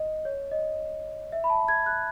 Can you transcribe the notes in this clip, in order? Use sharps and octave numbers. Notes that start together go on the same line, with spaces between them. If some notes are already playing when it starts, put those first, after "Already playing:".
Already playing: D#5
C#5
D#5
E5
B5
A5
G#6
F#6